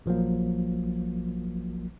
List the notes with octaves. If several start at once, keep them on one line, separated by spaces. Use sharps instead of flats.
A#1 F3 F#3 A#3